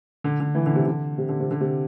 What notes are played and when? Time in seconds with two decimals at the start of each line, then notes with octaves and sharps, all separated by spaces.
0.24 D3
0.40 D3
0.55 E3
0.66 D3
0.76 C3
0.85 D3
1.18 C3
1.29 D3
1.40 C3
1.51 D3
1.61 C3